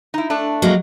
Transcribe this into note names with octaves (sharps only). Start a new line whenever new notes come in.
D#4 E4
A3 D4
F#3 G#3 A#3